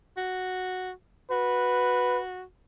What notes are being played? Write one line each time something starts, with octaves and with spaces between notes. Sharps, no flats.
F#4
F#4 B4